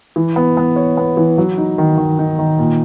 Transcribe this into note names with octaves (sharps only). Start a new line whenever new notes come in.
E3
B3
B3
C#5
B3
E3
F#3
D#4
D#3
D#3
D#4
D#3
A#2